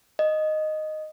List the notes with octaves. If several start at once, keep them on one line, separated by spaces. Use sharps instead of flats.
D#5